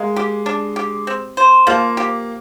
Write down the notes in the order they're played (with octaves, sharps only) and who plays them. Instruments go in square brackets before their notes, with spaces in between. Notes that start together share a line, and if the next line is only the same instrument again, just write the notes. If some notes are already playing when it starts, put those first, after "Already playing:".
Already playing: [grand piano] G#3 [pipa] A#3
[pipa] G4
D4
G4
C4
C5
[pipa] F3 [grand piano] A#3
[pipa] G4